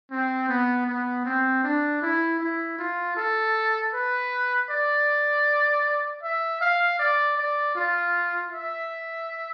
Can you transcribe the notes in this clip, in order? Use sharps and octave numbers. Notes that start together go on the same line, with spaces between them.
C4
B3
B3
C4
D4
E4
E4
F4
A4
B4
D5
E5
F5
D5
D5
F4
E5